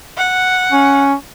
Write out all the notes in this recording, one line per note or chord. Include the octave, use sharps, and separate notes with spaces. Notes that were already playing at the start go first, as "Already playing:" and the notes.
F#5
C#4